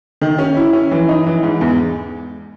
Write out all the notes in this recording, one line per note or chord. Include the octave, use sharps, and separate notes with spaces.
D#3
C#4
E4
C#4
E3
D#4
E3
G#2
E2